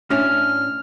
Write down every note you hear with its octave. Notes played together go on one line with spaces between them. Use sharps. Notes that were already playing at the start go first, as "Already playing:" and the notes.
A2 C#4 D4 F6